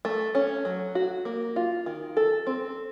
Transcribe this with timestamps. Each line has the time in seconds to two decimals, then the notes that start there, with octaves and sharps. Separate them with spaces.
0.05 A3
0.35 C#4
0.65 F#3
0.95 F#4
1.25 A#3
1.56 F4
1.86 D#3
2.17 A4
2.47 C4